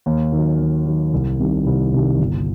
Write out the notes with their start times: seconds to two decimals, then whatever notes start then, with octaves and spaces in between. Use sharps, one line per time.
0.06 D#2
0.32 D#3 F#3
0.59 D#2
0.85 D#3 F#3
1.13 C2
1.40 C3 D#3 G3
1.66 C2
1.92 C3 D#3 G3
2.19 G1